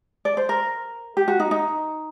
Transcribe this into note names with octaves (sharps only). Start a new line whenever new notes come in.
D5
C5
A#4
G4
F#4
D#4
D#4